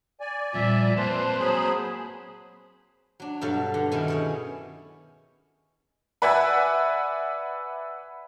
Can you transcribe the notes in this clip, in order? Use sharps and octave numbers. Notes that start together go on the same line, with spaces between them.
D5 G#5
F2 A#2 G3 E5
A#3 C4 B4 C5 A5 C6
F#3 G#4 B5
F#3 D4
G2 B2 F#3 A4 F5
D3
B2 D#3 C#4 E4
E4 G#4 C#5
B4 D5 E5 F#5 G#5